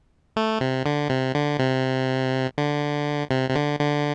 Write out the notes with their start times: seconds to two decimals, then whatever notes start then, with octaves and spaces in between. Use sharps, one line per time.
0.36 A3
0.61 C3
0.86 D3
1.10 C3
1.35 D3
1.59 C3
2.58 D3
3.31 C3
3.50 C3
3.56 D3
3.80 D3